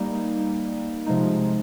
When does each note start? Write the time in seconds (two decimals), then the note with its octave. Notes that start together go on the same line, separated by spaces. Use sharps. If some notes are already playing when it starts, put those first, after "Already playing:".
Already playing: G3 A#3 D#4
1.06 C3 F3 G#3 D#4